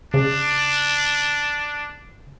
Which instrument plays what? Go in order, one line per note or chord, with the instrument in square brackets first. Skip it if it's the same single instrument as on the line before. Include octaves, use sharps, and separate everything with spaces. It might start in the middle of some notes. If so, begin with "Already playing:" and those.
[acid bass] C#3 [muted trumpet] D4